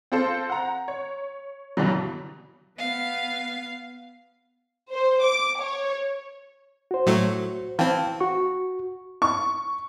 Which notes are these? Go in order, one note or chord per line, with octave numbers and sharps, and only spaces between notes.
C4 F4 A4 C5
F#5 A#5
C#5
G2 B2 D3 E3 F#3
B3 F5
C5
D6
C#5
F#4 C5
A2 F#3 A3
E3 C4 F5 G5 A5
F#4 C#6
C#6